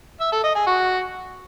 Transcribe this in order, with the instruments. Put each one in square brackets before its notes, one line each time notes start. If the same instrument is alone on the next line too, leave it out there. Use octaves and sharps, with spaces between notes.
[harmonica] E5
A4
D#5
G#4
F#4